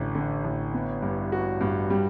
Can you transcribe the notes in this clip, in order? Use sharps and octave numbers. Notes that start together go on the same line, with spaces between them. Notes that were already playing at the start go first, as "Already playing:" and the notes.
Already playing: A1 D3
D3
A1
B3
G2
F#4
G2
G3